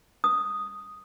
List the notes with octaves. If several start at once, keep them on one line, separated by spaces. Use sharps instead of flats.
D#6